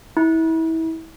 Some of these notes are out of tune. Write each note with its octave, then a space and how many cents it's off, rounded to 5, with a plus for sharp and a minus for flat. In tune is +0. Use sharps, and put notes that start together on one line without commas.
E4 -30